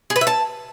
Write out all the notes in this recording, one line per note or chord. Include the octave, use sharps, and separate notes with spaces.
G#4
B4
E5
A5